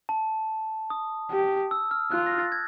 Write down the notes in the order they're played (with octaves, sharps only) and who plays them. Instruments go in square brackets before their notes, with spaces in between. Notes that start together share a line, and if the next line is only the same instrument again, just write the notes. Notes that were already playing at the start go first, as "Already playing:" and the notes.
[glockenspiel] A5
D#6
[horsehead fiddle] G4
[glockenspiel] E6
F6
[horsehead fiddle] F4 [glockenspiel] F#6
[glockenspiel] A#6
A6
G#6